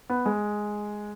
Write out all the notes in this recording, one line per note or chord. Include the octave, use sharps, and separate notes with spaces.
B3
G#3